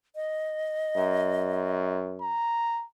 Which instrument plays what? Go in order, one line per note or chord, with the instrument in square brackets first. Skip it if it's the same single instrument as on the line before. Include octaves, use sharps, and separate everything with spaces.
[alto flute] D#5
[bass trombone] F#2
[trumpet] A#5